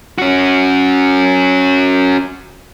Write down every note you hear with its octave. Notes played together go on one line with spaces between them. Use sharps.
C#4 F#4